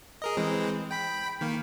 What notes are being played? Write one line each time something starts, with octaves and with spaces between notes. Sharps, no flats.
G#4 A#4 D#5
E3 G#3 C4
G5 B5 B6
D#3 A#3